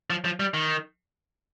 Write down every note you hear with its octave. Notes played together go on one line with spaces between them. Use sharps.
F3
F3
G3
D#3